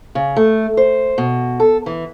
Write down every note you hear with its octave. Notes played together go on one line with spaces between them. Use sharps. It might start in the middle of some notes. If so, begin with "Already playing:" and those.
C#3
A3
C5
B2
A4
E3